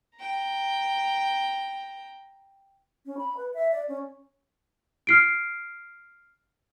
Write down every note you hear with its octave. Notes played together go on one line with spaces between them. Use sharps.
G5 A#5
C#4
B5
B4
E5
D5
C#4
F6 C7 D7